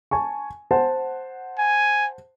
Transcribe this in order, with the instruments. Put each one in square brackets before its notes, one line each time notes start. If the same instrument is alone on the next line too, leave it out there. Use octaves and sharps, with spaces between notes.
[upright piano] G#5 A5 C#6
C5 F#5 A5
[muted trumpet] G#5